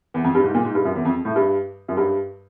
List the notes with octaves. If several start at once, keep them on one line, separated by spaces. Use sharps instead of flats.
E2
F2
G2
G#2
A#2
G#2
G2
F#2
E2
F2
A2
G2
F#2
G2